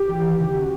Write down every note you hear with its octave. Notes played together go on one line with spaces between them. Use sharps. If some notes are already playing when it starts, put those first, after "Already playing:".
Already playing: G4
E3
D#2
C#3
F#4